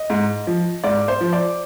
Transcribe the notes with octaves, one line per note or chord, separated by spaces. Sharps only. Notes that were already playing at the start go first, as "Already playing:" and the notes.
Already playing: D#5
G#2
F3
G#2 D5
C5
F3
D5